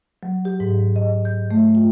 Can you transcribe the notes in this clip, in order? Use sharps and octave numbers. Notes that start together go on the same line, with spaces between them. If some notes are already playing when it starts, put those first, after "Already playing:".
F#3
G4
G#2
D#5
G6
A3
F4